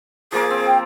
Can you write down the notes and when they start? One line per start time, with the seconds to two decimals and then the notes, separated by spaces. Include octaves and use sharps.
0.32 F3 A#3 G#4 D6
0.50 C4
0.67 G5